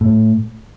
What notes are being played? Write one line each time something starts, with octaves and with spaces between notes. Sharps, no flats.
A2